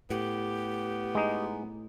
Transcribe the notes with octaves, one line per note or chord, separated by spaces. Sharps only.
A2 B3 G4
G#3 D#4